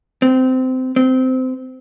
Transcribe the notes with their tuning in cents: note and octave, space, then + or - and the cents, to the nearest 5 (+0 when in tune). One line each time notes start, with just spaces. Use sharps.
C4 -20
C4 -20